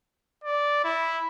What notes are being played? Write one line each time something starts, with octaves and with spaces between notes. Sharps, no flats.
D5
E4